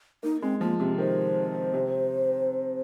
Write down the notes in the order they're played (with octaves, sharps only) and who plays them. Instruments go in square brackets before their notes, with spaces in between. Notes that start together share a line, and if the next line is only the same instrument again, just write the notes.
[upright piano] A#3 [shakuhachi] D#4
[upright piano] G#3 [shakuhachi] C4
[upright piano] F3 [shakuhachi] A#3
[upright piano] C3 [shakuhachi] C4
[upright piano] D#3 [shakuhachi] C5
[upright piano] C3